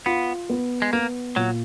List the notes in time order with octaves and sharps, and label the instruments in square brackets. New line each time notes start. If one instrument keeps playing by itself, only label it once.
[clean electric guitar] B3 [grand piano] F4
[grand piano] B3
[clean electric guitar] G#3
[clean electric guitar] A#3 [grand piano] B3
[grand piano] A#2 [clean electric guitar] F#3